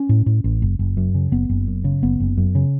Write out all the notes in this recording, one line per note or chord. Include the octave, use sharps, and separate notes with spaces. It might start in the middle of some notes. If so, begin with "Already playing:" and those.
Already playing: C#4
A2
A2
A1
F#1
F#1
F#2
C#3
F#1 B3
F#1
F#2
C#3
F#1 B3
F#1
F#2
C#3